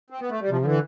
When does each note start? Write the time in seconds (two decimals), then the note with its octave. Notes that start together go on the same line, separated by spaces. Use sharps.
0.10 C4
0.20 B3
0.30 A3
0.40 G3
0.50 C3 F3
0.61 F3
0.65 D3 E3